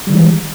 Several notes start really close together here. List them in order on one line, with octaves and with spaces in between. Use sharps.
G3 D#3 E3 G#3